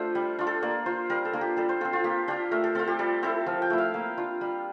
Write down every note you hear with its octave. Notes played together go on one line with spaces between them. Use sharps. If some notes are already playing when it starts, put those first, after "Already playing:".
Already playing: A3 D4 F4 G4 A4 C5
G3
D4 F4
A4
A#3 D5
F4 C5
G3 A#4
A4
A#3 D4 F4
G4
G3 A4
C5
C4 F4 A4
F4
A#3 G4
D4 F4 G4
A3 A#4
A4
C4 F4 A4
G4
G3 A4
C4 E4 A4
F3 A#4
G5
A3 E4
F5
A#3
D4 F4
G3